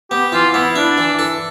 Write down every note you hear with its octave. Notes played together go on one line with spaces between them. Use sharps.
B3 G4
E3 F4
B3 E4
D4 E4
E3
A4